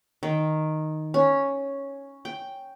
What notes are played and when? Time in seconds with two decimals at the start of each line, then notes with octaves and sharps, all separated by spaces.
0.23 D#3
1.14 C#4
2.25 G5